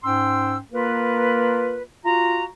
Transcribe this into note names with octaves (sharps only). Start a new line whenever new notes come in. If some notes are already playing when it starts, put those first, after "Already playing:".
G#2 C#4 G5 C6 E6
A#3 F4 A#4 B4
F4 F#4 A#5